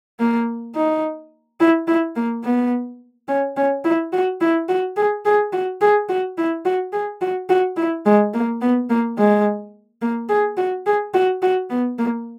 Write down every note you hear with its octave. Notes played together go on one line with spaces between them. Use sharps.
A#3
D#4
E4
E4
A#3
B3
C#4
C#4
E4
F#4
E4
F#4
G#4
G#4
F#4
G#4
F#4
E4
F#4
G#4
F#4
F#4
E4
G#3
A#3
B3
A#3
G#3
A#3
G#4
F#4
G#4
F#4
F#4
B3
A#3